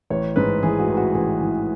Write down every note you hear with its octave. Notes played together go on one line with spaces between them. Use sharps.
A1 C#5
G#2 B4
E3 G#4
F#4
A1
F#4
A1 G#4
E3